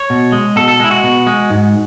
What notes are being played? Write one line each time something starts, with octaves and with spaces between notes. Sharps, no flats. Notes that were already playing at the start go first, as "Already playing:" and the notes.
Already playing: C#5
B2
G#3
B2 A4
A4
G#3 E4
F#4
B2
G#3
G#2